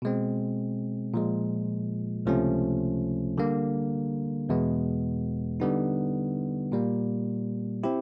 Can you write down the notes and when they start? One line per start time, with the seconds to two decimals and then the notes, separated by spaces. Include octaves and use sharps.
0.02 B2 G#3 C4
1.14 A#2 F3 G#3
2.26 C#2 C3 F3 A3 C#4
3.38 D3 G3 A#3
4.49 E2 B2 G#3 B3
5.60 D3 G3 B3 D#4
6.72 A#2 G3 A#3
7.83 C4 E4 G4